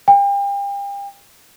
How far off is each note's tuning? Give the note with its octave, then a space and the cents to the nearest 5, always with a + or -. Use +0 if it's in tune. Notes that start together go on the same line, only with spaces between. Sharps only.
G5 +35